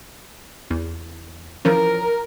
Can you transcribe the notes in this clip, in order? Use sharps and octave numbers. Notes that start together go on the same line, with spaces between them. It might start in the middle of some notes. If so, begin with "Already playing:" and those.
E2
E3 F3 C#4 A#4